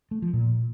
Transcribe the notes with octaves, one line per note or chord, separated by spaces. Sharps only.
A3
F3
A#2